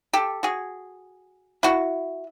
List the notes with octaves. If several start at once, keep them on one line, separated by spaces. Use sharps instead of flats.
G4 A4
F#4 G#4
E4 F#4